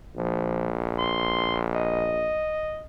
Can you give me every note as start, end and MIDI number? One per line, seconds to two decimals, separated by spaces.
0.16 2.41 34
0.16 0.71 53
0.98 1.58 84
1.74 2.84 75